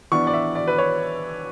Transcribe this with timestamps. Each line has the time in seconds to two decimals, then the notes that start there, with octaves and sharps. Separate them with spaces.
0.12 E3 B3 D4 C#6
0.27 D5
0.34 E5
0.55 D5
0.68 B4
0.78 C#5